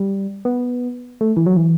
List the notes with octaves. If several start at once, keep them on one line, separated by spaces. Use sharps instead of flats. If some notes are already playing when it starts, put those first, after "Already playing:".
Already playing: G3
B3
A3
E3
F#3
E3